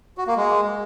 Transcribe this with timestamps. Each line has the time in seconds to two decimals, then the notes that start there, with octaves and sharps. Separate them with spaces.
0.18 F#4
0.27 A#3
0.37 G#3